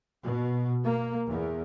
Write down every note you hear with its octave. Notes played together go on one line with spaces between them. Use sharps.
B2
A#3
E2